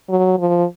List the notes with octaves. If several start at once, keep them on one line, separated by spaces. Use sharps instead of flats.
F#3
F3